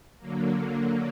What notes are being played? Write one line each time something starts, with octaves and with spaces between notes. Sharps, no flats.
D3 F#3 A#3